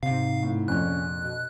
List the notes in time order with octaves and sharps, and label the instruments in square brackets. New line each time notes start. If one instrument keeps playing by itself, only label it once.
[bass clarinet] G#2 [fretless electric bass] C3 [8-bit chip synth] F5
[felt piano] A2
[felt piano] A#1 F2 [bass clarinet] C#4 [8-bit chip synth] F#6
[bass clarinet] B2